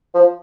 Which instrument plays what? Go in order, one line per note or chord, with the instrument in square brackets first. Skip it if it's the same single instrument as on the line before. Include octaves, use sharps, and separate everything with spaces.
[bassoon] F3